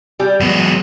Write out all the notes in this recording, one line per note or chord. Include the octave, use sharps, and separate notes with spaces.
G3 G4
F#3 G#3 B3